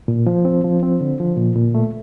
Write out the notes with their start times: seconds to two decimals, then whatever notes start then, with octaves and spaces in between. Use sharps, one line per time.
0.08 A#2
0.27 F3
0.45 C4
0.64 F3
0.83 C4
1.01 D3
1.20 F3
1.37 A#2
1.56 A#2
1.75 A3